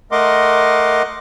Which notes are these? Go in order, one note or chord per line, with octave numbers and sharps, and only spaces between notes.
A3 A#4 D#5 F#5 C6 D6